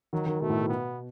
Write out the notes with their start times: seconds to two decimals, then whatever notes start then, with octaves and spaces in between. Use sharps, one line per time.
0.13 D#3 F#3
0.26 D#3
0.41 B2 A3
0.50 A2
0.59 B2
0.69 B3